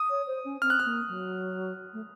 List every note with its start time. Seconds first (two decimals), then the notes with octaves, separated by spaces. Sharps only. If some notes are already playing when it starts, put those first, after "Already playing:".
Already playing: D#6
0.09 C#5
0.27 C5
0.45 C#4
0.62 C4 F6
0.70 F#6
0.79 F6
0.85 A#3
1.08 F#3
1.93 A3